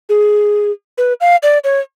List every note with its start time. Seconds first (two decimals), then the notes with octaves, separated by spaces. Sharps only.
0.09 G#4
0.98 B4
1.21 F5
1.43 D5
1.64 C#5